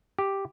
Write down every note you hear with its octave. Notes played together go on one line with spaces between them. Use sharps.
G4